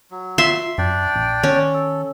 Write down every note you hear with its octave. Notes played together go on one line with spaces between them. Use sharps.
F#3
F4 E5 C6
F#2 D4 D5 G5
A#1
D#3 C#4
A4